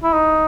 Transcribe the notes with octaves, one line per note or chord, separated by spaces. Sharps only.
E4
D#4